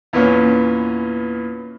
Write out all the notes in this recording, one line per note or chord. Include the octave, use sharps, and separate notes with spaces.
E2 A#2 B3 C#4